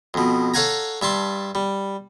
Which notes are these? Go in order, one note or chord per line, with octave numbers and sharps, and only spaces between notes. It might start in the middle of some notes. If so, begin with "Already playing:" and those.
F2 B2
A4 C#5 F5 F#5 G#5 A#5
G2 E5 A5 C6
G3